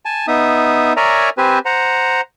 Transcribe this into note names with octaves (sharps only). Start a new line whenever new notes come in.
G#5 A5
B3 D#4 E5 D#6
A#4 C#5 D5 E5 G#5 A#5
C4 G4 B4 C5 G#5
C5 F#5 A#5